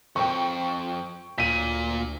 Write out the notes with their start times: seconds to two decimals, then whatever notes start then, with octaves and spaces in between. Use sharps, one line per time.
0.16 F2 G5 C#6
1.38 D2 A#2 B6 D#7